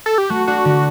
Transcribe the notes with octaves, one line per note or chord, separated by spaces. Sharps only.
A4
G4
A3 F#4
D4 F#4
D3